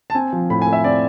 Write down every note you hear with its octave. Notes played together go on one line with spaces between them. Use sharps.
A5
C4 G#5
F3
A2 B5
G#5
A3
E5
C4 D5